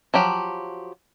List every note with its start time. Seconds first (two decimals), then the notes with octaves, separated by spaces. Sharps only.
0.14 F3 F#3 G4